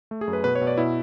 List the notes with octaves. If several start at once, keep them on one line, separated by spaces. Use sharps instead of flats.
A3
G#4
F#2
B4
B2 B4
C#5
B2
D5
B2 E4